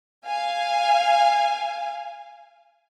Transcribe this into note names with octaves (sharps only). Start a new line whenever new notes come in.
F5 G#5